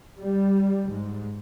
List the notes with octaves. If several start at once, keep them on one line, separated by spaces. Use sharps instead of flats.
G3
G#2